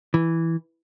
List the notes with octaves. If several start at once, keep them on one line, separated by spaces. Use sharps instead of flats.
E3